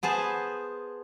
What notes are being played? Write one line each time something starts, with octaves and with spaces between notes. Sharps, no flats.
B3 G#4 C5 A5